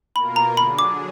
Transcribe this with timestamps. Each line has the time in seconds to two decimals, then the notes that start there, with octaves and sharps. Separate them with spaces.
0.15 B2 A#3 F4 A#4 B5
0.36 A#5
0.57 D3 F#3 D4 G#4 B5
0.79 D6